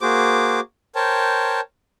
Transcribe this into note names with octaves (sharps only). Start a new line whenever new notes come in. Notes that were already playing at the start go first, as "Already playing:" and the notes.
A#3 F#4 G#4 C5 D6
A#4 C5 C#5 G5 A5